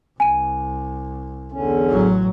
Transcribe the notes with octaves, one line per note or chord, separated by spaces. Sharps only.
C2 G#5 D#7
E2 D3 C#4
A1 F#3